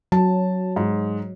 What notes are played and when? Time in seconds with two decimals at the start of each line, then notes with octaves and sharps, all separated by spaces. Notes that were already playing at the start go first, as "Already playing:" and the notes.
0.12 F#3 A5
0.76 G#2